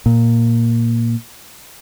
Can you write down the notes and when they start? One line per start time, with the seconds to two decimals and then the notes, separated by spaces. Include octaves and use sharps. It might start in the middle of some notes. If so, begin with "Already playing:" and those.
0.06 A#2